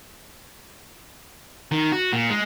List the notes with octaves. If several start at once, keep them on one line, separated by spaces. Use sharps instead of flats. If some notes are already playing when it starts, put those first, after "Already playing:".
D#3
F#4
A#2
G#3